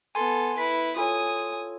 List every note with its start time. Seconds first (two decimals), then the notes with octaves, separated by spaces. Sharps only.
0.15 B3 A4 G#5 C6
0.58 E4 B4 B6
0.96 F4 A4 C#5 G#5 D#6